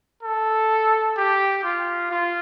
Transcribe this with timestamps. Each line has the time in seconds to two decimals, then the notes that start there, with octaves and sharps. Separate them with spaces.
0.23 A4
1.17 G4
1.64 F4
2.11 F4